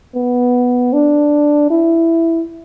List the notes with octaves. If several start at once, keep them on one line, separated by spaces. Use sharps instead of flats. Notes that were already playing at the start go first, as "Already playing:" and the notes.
B3
D4
E4